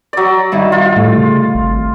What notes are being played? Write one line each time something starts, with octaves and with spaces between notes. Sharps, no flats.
F#3 D5
G2 D#3 E4
F4
A2 A3
C#3
G#1